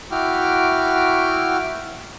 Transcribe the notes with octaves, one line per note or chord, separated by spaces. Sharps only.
E4 F#4 G5 D6 F6